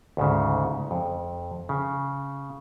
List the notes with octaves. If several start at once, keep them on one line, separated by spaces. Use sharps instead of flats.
D2 G#2 C#3
F2
C#3